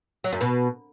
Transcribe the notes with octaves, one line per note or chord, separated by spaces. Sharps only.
F#3
F#2
B2